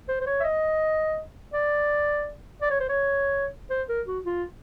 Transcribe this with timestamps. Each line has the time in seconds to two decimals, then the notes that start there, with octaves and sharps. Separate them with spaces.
0.08 C5
0.21 C5
0.26 C#5
0.40 E5
0.44 D#5
1.53 D5
2.62 D5
2.70 C#5
2.80 C5
2.89 C#5
3.70 C5
3.89 A#4
4.07 F#4
4.25 F4